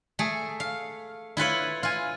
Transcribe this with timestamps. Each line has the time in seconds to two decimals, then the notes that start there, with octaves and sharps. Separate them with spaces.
0.19 A3 G#4
0.60 F5
1.37 E4 F4 B4 C#5
1.83 F4 G#5